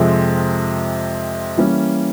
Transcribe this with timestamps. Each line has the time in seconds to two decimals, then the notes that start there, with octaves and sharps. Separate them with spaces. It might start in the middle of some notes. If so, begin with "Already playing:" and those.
Already playing: F2 C3 F3 G#3 C4
1.57 E3 G3 A#3 C#4